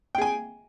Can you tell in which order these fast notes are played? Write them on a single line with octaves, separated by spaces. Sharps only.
G5 G#4 G#5